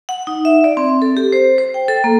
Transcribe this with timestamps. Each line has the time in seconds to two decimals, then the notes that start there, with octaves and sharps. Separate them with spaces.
0.09 F#5
0.27 D#4
0.45 E5
0.64 D5
0.77 C4
1.02 A4
1.17 G4
1.33 C5
1.58 C5
1.74 G5
1.88 A4
2.04 A#3